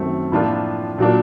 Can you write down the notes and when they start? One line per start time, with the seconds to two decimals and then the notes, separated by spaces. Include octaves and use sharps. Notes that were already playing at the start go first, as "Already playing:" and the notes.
Already playing: F#2 D#3 F#3 A3 C4
0.32 A2 F3 A#3 D4 F4
0.98 A#2 F#3 A#3 D4